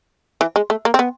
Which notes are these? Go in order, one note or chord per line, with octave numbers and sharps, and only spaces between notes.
E3
G#3
A3
A#3
C4
B3